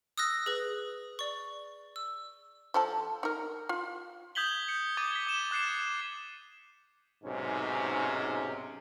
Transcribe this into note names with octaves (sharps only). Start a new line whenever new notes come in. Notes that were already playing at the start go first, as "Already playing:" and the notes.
D#6 E6 F#6 A#6
G#4 B4
D5 C#6
E6
F3 A4 A5
D#4 A#4
F4
D#6 G6 G#6 B6 F#7 G7
C#7
D6 D#6 G#6 A6 D#7 G7
B6 G7
D#6 E7 G7
D6 F#6 A6 C7 C#7 E7
B1 G#2 C3 G#3 C#4